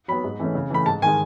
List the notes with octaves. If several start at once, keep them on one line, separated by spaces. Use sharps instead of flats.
F#3 B3 B5
G#2
E3 A3 C#4
C#3
E3 A3 B5
G#2 A5
D#3 G#3 G#5